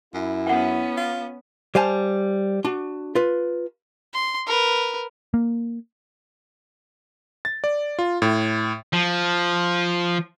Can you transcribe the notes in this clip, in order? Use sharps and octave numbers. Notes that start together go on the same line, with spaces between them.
F#2 E4
B3 C#4 F#5 G5
F4
G3 C5 F5 G#5 A5
D4 F#4
F4 B4
C6
A#4 B4
A#3
A6
D5
F4
A2
F3